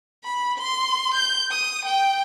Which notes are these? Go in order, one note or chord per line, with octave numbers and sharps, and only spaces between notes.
B5
C6
G6
D#6
G5